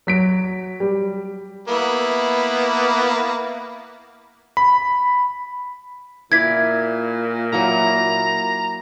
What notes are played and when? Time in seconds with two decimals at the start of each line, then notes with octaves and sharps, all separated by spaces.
0.07 F#3 B6 D7
0.80 G3
1.68 A#3 B3 E4
4.57 B5
6.32 A#2 E4 D5 G#6 B6
7.53 F#3 A#3 E4 A#5